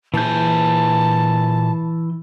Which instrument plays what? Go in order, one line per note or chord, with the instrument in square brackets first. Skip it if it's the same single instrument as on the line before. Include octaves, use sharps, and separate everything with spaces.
[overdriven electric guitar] A#2 G#4 [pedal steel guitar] E3 G6 [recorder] A5